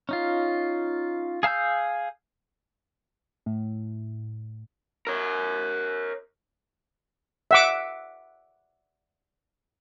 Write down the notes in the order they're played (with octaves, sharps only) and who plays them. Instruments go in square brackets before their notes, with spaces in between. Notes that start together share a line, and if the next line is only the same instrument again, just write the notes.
[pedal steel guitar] C#4 D#4 F4
G#4 F5 A5 E6 G6
[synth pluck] A2
[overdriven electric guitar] A#4 C#5
[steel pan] E5 F#5 D6